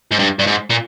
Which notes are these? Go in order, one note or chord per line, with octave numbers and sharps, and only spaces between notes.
G#2
G2
G2
G#2
A#2